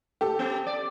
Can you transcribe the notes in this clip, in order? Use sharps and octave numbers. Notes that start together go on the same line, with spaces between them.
G4 A4
B3
D5